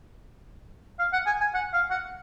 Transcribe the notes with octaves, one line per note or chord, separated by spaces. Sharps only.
F5
F#5
G#5
G#5
F#5
F5
F#5